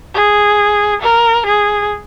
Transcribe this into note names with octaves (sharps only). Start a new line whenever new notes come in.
G#4
A#4
G#4